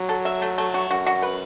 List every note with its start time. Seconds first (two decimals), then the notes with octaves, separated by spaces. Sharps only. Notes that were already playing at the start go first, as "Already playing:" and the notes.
Already playing: F#3
0.09 A4
0.25 E5
0.42 A3
0.58 A3
0.74 F#4
0.90 F#2 F#4
1.06 F#4
1.22 B4